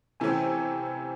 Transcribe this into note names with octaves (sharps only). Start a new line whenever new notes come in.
C3 E3 A3 C#4 G#5
G5
G#5